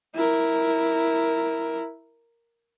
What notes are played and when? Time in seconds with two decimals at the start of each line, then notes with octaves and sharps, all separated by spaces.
0.15 E4 A#4